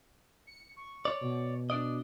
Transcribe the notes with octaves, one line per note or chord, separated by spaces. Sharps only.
C#7
C#6
C#5 D5
B2
D4 D5 D#5